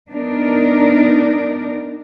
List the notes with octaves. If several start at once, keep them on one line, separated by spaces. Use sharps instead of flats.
B3 D4 D#4 A#4